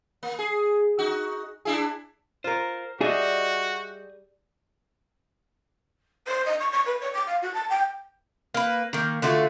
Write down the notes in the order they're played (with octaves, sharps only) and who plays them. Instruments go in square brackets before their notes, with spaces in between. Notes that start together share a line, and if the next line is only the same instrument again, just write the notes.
[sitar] A#3
G#4
D#4 F#4
D4 E4 G#4
[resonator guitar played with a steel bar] F4 A#4 [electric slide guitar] C5
[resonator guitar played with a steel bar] G3 [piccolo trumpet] F#4 [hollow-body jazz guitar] G#4 [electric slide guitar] D#5 E5
[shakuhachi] C5
D#5
C#6
C#6
B4
C#5
D6
F5
F#4
A5
G5
[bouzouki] A#3 B4
D#3 A#3
D3 A3 F4 F#4